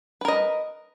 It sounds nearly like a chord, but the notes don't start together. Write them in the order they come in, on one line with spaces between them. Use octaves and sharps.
B4 A#4 D#5